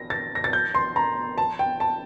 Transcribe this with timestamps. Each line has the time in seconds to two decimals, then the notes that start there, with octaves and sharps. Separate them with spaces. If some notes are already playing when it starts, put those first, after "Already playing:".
Already playing: A#6
0.10 A6
0.35 A#6
0.44 A6
0.53 G6
0.75 C6
0.96 A#5
1.38 A5
1.59 G5
1.80 A5